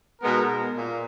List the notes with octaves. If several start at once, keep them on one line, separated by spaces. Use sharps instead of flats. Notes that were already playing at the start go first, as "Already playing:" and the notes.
B2 G#3 B3 D#4 A#4
A#2